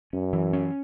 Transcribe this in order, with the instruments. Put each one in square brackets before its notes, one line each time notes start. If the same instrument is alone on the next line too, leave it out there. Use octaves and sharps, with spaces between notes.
[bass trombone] F#2 [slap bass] C#4
[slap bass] E3
C#4